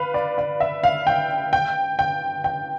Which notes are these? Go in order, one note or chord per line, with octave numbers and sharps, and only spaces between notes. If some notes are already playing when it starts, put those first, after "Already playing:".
Already playing: B4 F5
D5
D5
E5
F5
G5
G5
G5
G5